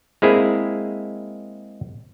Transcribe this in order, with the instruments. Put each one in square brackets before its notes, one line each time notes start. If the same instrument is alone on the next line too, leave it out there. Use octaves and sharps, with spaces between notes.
[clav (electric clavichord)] G#3 A#3 C4 E4 G#4